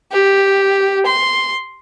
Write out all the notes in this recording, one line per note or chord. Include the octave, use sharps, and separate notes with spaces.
G4
C6